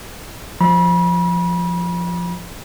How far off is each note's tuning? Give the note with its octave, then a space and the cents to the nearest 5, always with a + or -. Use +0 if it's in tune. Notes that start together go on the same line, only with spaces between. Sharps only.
F3 +0 B5 -35